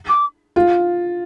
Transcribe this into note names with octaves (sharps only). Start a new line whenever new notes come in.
D6
F4